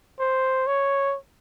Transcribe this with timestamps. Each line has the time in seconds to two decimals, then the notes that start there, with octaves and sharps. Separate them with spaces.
0.20 C5
0.67 C#5